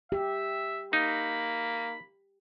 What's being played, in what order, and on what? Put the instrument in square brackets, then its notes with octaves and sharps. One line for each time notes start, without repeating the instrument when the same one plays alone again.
[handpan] G4 [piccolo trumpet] E5
[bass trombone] A#3 [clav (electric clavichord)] D#4 [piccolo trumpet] B5